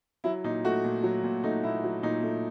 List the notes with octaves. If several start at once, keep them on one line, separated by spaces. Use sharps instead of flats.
F#3 E4
A#2 D#4
A3 F#4
A#2
F#3
A#2
A3 D#4
A#2 E4
F#3
A#2 D#4
A3